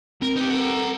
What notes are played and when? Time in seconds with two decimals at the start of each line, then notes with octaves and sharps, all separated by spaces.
0.22 C4 A#4
0.36 D#4 G4 B4
0.50 A4 A#4 F#5